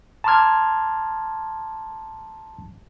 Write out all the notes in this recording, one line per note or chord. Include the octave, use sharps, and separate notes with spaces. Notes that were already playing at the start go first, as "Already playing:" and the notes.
A5 A#5 C6 D6 F6 G#6